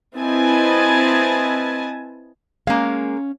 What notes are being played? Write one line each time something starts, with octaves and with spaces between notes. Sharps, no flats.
C4 E4 B4 D#5 G#5 A5
G#3 A#3 C#4 F5